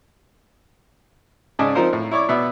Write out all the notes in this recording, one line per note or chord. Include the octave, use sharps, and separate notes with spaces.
G#2 C#3 D5 D#5 G#5 A5
F3 C4 D#4 F4 A#4 C5
A2
E4 C#5 D5 C#6 D6
B2 B3 D5 E5